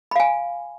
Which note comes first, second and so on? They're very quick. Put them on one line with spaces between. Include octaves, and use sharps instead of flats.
B5 F5 G#5